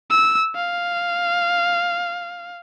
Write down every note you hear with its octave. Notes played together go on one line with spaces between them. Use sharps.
E6
F5